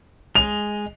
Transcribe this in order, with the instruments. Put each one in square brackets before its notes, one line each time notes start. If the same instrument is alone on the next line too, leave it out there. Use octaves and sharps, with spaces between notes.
[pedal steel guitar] G#3 D#5 [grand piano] F7